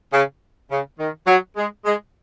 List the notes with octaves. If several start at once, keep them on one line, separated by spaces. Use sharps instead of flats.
C#3
C#3
D#3
F#3
G#3
G#3